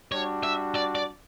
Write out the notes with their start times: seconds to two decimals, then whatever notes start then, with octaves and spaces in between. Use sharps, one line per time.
0.12 G3 D4 F#4 C#5
0.43 E5
0.75 D5
0.95 D5